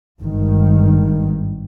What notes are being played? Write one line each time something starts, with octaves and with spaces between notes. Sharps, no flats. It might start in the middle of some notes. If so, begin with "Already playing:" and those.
G#1 G2 D#3